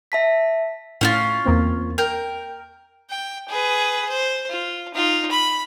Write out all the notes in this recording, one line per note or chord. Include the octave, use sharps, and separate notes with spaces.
E5 A5 B6
A2 C#4 E4 F4
E2 A#3 C4
A#4 G5
G5
G#4 B4
C5
F4
D#4 F4
B5